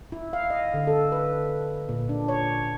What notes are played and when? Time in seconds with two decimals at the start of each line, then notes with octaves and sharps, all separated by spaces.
0.12 E4
0.33 F5
0.50 D#5
0.74 D3
0.87 A4
1.12 B4
1.89 A#2
2.09 D4
2.28 C#5